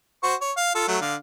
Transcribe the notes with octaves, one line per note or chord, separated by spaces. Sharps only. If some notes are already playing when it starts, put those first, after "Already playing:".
F#4 C5 C#6
C#5
F5
F4 A4
F#3 A3
D3 F5